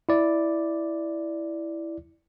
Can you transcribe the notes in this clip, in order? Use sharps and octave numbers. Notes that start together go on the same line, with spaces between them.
E4 D5